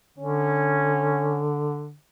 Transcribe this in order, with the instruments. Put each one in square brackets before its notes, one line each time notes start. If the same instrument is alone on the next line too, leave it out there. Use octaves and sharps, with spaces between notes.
[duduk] D3 [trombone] C#4